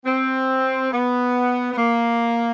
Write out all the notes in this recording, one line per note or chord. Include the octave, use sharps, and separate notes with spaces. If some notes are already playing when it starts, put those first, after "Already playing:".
C4
B3
B3
A#3